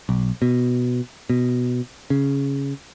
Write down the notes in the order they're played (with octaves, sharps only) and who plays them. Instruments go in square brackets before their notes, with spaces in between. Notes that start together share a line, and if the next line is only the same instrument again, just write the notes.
[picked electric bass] B1
B2
B2
C#3